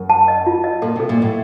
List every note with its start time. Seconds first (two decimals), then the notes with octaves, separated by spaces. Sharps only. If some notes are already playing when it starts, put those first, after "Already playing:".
Already playing: F#2
0.10 A5
0.28 D#5
0.47 F4
0.64 D#5
0.82 A#2 A4
0.96 C3 A4
1.09 A#2
1.18 A2 D#5